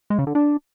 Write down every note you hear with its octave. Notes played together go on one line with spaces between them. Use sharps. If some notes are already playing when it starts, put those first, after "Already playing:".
G#3
C#3
D3
D4